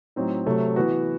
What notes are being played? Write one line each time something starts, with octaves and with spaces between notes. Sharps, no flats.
A2 F#3 C4 D#4
C3 F#3 A3
E3 B3 F#4